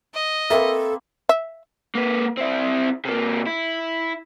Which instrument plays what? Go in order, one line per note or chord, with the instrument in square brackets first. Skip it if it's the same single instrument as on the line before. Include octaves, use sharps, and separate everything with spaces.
[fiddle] D#5
[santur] A#3 C4 B4 [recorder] A4 [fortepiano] E5
[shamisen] E5
[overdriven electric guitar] A#3 B4
C4 E4
C3 A#3
E4